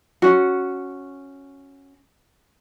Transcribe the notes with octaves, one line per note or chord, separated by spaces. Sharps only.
C#4 F#4